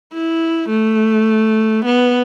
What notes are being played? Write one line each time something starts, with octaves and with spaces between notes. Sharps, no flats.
E4
A3
B3